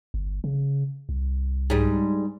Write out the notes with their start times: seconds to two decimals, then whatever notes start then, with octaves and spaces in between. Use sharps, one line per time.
0.14 G1
0.44 C#3
1.09 C2
1.70 G#2 G3